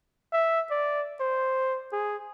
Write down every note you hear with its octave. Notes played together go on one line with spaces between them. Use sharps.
E5
D5
C5
G#4